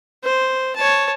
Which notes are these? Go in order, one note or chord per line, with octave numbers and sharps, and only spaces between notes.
C5
C#5 A5